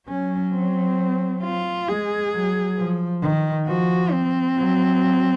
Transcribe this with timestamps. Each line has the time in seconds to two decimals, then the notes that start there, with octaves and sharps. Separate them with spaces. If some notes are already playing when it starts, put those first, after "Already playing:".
0.09 F#3 C#4
0.54 C4
1.43 F4
1.88 G#3 G#4
2.33 F#3
2.78 F3
3.22 D#3
3.67 F3 F#4
4.12 C4
4.57 F#3